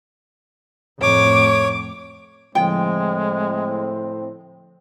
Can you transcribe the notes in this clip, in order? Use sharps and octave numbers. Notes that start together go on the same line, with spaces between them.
F2 A2 C#5 D6
A2 D3 F3 G#3 C4 G5